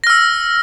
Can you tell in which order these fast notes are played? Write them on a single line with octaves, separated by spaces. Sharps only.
A#6 F6 E6